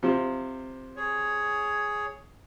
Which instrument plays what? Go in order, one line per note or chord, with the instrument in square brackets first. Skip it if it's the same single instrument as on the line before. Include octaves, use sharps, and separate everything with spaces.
[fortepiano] C3 F3
[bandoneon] G#4 C#5